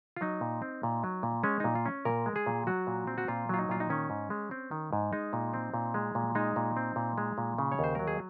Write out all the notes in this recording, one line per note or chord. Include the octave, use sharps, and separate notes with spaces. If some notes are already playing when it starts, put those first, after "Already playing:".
F4
F#3 D#4
A#2
C4
A#2
F#3
A#2
G#3 C#4
A#2 D#4
F4
C#4
A#2 A#4
G#3
G#4
A#2
F#3 F#4
A#2
C4
F#4
A#2 F4
F#3 F4
D#4
A#2 F4
D#4
D#3 C#4
G#2
G#3
C4
D#3
G#2
G#3 D#4
A#2
C4
A#2
G#3
A#2
G#3 D#4
A#2
C4
A#2
G#3
A#2
C#3
C#5
D#2 C5
F#3 A#4
G#4